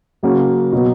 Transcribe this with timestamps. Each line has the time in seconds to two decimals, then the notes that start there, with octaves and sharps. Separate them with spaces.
0.23 C#3 F#3 A#3 C#4 F#4
0.72 B2 F#3 B3